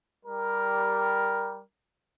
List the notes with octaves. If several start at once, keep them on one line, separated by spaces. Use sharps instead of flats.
G3 A#4